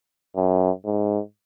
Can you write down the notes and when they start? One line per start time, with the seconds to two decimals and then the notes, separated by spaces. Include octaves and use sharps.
0.36 F#2
0.86 G#2